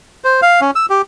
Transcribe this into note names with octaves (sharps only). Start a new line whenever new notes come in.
C5
F5
C#4
E6
G4